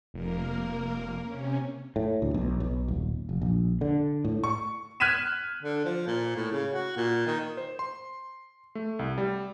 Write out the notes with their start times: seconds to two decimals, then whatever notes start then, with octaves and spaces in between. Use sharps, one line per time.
0.14 F1 A#3 A#4
1.23 C3 C#4
1.96 A2
2.22 D2
2.34 B1
2.60 B1
2.88 D#1
3.29 F1
3.42 A#1
3.81 D3
4.25 A2
4.44 C#6
5.00 F6 F#6 G#6 B6 D#7 E7
5.63 D3
5.85 F3
6.07 A#2
6.36 A2
6.52 C#3
6.73 F#4
6.97 A#2
7.27 D#3
7.57 C5
7.79 C6
8.75 A3
8.99 C2
9.18 G3